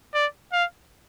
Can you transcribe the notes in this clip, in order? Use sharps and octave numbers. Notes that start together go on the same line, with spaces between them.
D5
F5